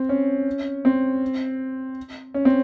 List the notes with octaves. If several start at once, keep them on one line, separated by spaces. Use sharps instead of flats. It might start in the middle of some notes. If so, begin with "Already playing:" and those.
Already playing: C4
C#4
C4
C#4
C4